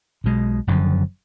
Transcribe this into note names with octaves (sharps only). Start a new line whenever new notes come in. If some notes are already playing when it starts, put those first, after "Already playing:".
B1 B2 G#3
F#1 F#2 D3 F3